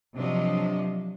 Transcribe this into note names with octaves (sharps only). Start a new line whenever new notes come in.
C3 F3 F#3 D4 D#5